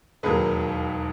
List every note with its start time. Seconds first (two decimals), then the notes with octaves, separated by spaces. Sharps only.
0.23 E1 D#2 D#3 F#3 G#4 B4